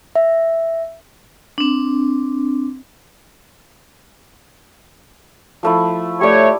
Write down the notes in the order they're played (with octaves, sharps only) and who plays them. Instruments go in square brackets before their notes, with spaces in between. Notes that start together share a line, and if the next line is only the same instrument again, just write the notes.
[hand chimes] E5
[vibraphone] C4 D4
[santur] F3 A3 E4
[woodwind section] A3 C#5 [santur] G4 D5